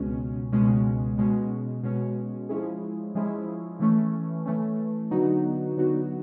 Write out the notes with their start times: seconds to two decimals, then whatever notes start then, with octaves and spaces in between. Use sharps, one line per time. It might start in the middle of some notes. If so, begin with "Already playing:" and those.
Already playing: C#2 B2 G#3 C#4
0.52 C#2 B2 G#3 C#4
1.18 B2 G#3 C#4
1.83 B2 G#3 C#4
2.49 F3 G#3 C#4 E4 G#4
3.15 F3 G#3 C#4 E4 G#4
3.80 E3 A3 C#4
4.46 E3 A3 C#4
5.11 D3 F#3 B3 D#4 F#4
5.77 D3 F#3 B3 D#4 F#4